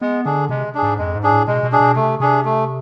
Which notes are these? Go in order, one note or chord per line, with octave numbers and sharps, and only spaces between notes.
G#3 B3
D3 D4 G#4
C3 G#3
D4 G#4
G#2
F2 G#3
G#2
D4 G#4
A2
B2 G#3
B2
D4 G#4
B2
C3 A3
C3 D4 G#4
A3